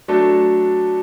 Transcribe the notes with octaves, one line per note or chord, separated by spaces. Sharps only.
F#3 A3 D4 A4